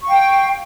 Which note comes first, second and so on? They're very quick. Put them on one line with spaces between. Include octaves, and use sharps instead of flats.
C#6 F5 G5